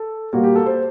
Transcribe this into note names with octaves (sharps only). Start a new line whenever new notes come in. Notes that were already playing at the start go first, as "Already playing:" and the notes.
Already playing: A4
A#2 G3 A#3 F#4
G4
A4
C5